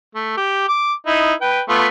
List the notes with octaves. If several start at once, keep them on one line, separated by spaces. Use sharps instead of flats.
A3
G4
D6
D#4 E4
B4 G5
A3 B3 F4